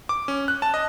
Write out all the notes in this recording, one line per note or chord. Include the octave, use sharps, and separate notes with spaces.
D6
C#4
F#6
A5
D#5